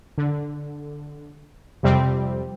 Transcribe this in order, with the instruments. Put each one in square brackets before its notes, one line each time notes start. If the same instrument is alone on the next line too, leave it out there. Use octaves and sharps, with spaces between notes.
[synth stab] D3
F2 C3 G3 C4